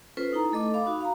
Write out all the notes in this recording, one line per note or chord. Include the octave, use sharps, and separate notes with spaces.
C#4 F4 A4 B4 C5
D#4 E4 A#5
A3 A4 D#5 D6
F5 B5 D6
D#4 F#4
F5 A#5